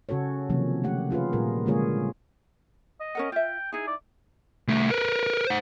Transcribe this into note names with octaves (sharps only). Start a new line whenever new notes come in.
C#3 C#4 F#4 A4 C#5
C3 D#3 F3 F#3 A#3 C#4
A3 G4 F#5
C#4 F4 G#4 B4
A#2 G3 G#4 A#4
D3 G#3 A#3 F4 G#4 C#5
D#5
C#4 A#4 F#5
F4 E5 G5
D#4 E4 G#4
D5
C2 A3
A#4 B4
C5 F#5